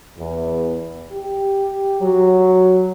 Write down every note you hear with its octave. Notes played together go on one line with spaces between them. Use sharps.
E2
G4
F#3